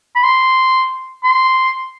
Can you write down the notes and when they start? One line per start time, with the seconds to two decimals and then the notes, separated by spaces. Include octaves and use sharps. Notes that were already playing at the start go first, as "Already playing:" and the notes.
0.15 B5
0.24 C6
1.24 C6